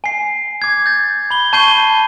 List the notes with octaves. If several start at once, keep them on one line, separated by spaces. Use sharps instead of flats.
G#5 C7
D6 G#6
G6 A6
B5 G7
A5 C#6 G6 C7 D#7 G7